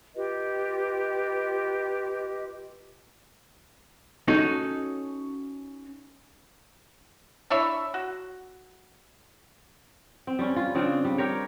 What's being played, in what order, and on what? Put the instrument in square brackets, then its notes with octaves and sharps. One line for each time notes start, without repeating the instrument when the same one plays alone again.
[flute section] F4 G4 B4 D#5
[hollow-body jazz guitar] C#4 D#4 F#4 A4 C#5 D#5
[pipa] D4 E4 C#5 E5
F#4
[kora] C4
G3 C#4
F4
C#3 C4 D4 F4
G3
G4 A#4 C#5